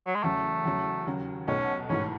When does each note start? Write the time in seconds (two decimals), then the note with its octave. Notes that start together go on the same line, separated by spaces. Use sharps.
0.07 F#3
0.15 G#3
0.23 E2 C#3 F#3 A3 C#4
0.65 E2 C#3 F#3
1.06 D#2 C#3 F#3
1.48 B1 B2 A3 C#4 D#4 F#4
1.89 A1 G#2 E3 A3 C#4